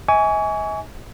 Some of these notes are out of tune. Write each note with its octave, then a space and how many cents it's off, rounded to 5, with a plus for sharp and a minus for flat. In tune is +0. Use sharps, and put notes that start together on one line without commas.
D#5 +45 G#5 +0 C#6 +35